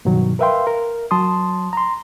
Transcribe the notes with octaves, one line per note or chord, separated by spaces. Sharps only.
G2 B2 D#3 F#3
A#4 B4 E5 F5 G5 C6
A#4
F#3 A5 C6 D#6
A#5 C6